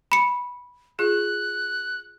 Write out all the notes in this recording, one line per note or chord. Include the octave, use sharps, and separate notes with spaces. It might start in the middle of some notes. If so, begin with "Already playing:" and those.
B5 C#7
F4 G#4 F#6